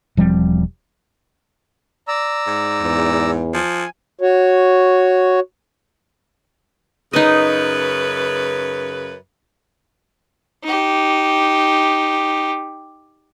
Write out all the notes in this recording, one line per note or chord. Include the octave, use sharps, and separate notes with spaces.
E1 F3 G3 C4
D5 A#5 E6
G#2
E2
F3 G#5
F#4 C#5
F#2 C#3 D#4 B4 D#5
D#4 G4